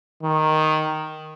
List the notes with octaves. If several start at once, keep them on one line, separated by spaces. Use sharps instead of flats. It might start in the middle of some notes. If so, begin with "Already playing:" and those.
D#3